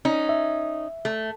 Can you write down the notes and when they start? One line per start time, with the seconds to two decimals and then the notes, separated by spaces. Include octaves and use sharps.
0.05 C#4 D#4
0.29 E5
1.05 A3